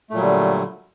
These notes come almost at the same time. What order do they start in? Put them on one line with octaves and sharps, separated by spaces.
A3 A#2 F#3 G3 D3